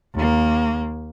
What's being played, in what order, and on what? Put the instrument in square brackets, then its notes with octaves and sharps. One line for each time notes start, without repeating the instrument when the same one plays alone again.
[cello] D#2 A#3